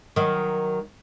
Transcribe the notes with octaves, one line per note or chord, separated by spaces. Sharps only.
D#3 F#3